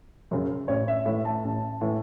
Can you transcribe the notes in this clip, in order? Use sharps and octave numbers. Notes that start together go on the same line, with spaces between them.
F#2 C#3
A1 C#5
E5
A2 E3 E5
A5
A1
A2 E3